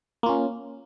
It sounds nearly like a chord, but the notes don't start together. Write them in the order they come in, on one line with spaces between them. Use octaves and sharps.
A#3 F4 C#4